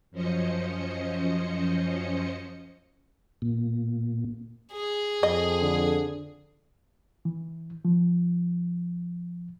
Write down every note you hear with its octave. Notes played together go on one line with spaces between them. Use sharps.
F#2 F3 C#4 C5 D#5 C#7
A#2
G#4
F2 D#5
D3
E3
F3